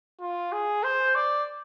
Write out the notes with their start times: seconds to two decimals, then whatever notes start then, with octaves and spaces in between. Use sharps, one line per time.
0.21 F4
0.52 G#4
0.83 C5
1.15 D5